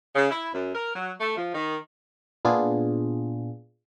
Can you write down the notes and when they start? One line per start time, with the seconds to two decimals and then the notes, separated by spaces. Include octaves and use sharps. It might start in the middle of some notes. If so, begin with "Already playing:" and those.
0.15 C#3
0.30 E4
0.54 F#2
0.75 A#4
0.95 F#3
1.20 A3
1.36 F3
1.55 D#3
2.45 A#2 B3 D4 F4 G#4